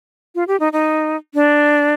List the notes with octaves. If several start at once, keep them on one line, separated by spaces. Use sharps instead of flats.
F4
G4
D#4
D#4
D4